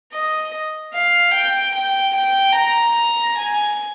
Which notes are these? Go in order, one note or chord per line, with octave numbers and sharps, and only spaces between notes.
D#5
F5
G5
G5
G5
A#5
G#5